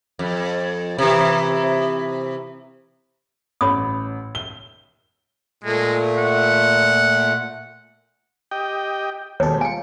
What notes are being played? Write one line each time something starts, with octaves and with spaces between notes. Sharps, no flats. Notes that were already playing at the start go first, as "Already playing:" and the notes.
F2
C3 E3
A1 C#5 B5 D#6
G7
A#2 G#3 A3
F#5
G4 D#5 G5
D#2 B2 G3 G#3 A4 C#5
F4 G#5 C#7